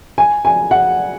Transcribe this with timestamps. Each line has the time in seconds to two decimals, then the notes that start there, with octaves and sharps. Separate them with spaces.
0.18 G#5
0.45 G#5
0.71 F#5